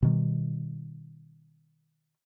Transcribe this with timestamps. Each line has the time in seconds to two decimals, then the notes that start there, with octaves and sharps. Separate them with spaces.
0.02 B2 D#3 G3